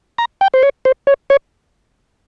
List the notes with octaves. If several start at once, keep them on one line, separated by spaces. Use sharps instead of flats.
A#5
G5
C5
C#5
C5
C#5
C#5